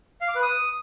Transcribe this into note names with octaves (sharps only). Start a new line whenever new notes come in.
F5
D6
B4
D#6